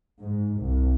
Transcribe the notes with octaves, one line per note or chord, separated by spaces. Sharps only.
G#2
C2